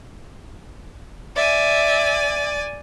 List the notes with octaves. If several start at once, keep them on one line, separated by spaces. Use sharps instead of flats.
D5 E5 G#5